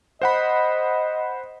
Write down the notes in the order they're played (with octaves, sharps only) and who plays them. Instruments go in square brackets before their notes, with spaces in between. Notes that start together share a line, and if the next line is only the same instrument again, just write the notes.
[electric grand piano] C5 F#5 B5 [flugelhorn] D#5